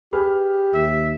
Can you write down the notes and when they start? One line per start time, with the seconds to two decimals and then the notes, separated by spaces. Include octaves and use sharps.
0.13 G4 G#4 B4 F6
0.74 D#2 E5